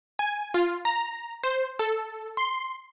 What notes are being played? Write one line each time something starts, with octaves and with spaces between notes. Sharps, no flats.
G#5
F4
A#5
C5
A4
C6